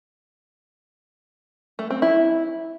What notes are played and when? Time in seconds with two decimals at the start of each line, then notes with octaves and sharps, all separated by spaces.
1.79 A3
1.90 C4
2.02 E4